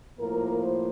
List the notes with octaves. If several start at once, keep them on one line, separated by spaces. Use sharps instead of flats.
A2 F3 A#3 A#4
C5